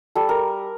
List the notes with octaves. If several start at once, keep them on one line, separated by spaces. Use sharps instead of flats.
G3 A4
A#4